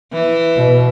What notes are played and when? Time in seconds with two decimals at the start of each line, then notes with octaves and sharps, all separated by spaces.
0.13 E3
0.55 B2